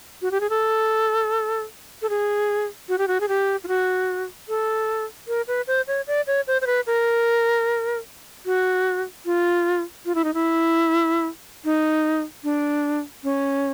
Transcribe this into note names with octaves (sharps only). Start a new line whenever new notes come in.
F#4
G4
G#4
A4
A4
G#4
F#4
G4
F#4
G#4
G4
F4
F#4
A4
A#4
B4
C5
C#5
D5
C#5
C5
C5
B4
A#4
F#4
F4
F4
E4
D#4
E4
D#4
D4
C#4